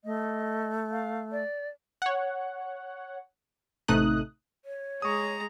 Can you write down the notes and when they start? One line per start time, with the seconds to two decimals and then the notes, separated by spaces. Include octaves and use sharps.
0.04 A3 D#5
0.91 F5
1.32 D5
2.02 C#5 F#5
3.88 A1 C3 A3 D#4 D#6 F#6
4.65 C#5
5.02 G#3 A#5 C#6 D#6